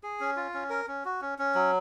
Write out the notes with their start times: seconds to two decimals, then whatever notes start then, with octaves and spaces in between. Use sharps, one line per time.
0.03 G#4
0.20 C#4
0.36 F4
0.54 C#4
0.70 A#4
0.87 C#4
1.05 F#4
1.21 C#4
1.38 C#4
1.55 F#3